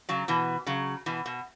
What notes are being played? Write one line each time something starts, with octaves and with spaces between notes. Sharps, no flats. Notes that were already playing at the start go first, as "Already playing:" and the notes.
C#3 F#3
B2 E3
C#3 F#3
B2 E3
B2